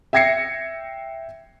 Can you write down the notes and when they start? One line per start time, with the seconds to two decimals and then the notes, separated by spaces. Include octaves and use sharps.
0.13 E5 G5 G#6 A#6 C7 C#7